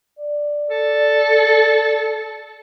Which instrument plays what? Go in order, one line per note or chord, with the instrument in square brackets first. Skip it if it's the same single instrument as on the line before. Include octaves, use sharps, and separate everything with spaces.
[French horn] D5
[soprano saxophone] A4